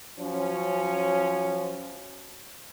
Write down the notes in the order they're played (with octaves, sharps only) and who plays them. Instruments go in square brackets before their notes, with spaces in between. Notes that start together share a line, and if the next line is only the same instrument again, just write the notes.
[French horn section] F3 F#3 C#4